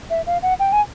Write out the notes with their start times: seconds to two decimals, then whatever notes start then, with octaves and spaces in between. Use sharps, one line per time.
0.10 E5
0.26 F5
0.43 F#5
0.60 G5
0.72 G#5